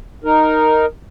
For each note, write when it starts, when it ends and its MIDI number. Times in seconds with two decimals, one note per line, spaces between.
0.24 0.86 63
0.24 0.86 70